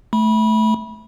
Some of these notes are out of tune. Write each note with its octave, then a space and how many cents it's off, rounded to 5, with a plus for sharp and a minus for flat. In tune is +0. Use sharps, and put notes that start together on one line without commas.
A3 -10 B5 -25